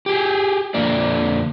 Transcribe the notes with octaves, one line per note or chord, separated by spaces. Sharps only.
G4 G#4
F2 D3 A#3 D5